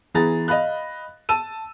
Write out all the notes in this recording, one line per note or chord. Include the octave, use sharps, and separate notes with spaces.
E3 B3 G#4 A#5 A6
D#5 F5 B5 F#6
A5 E6 D#7